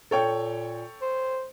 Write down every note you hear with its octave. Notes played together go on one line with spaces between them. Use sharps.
A#2 A4 C#5 G5
C5